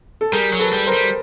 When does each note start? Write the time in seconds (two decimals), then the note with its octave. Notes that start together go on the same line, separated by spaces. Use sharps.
0.21 A4
0.32 G3 G#4 A#4
0.53 F#3
0.59 A4 B4
0.73 G3
0.86 A#4 C5
0.94 G3